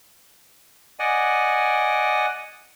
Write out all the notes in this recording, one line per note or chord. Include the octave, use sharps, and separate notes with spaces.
D5 D#5 F#5 G#5